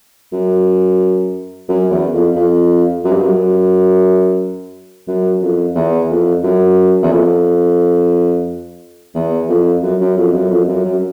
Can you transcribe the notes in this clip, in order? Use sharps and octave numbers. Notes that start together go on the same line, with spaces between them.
F#2
F#2
E2
F2
F2
F#2
G2
F#2
F#2
F2
E2
F2
F#2
E2
F2
E2
F2
F#2
F#2
F2
F#2
F2
F#2
F#2